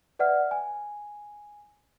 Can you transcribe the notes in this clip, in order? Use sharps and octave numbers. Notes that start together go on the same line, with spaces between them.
B4 D5 E5 F#5 F6
G#5